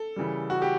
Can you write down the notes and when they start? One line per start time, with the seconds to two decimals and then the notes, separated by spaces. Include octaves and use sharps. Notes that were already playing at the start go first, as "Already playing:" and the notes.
Already playing: A4
0.16 C#3 E3 G3
0.50 F#4
0.62 G4